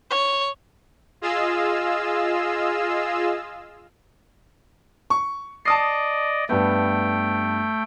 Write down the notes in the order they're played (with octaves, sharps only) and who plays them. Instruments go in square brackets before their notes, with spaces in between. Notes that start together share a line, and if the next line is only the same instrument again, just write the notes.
[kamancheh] C#5
[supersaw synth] F4 G#4 D#5 F5 E6
[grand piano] C#6
[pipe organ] D5 D#5 [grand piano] A5 D#6 C7
[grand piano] G2 B3 [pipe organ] A3 G5